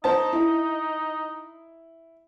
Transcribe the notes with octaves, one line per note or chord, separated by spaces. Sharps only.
D#4 C5 A5
E4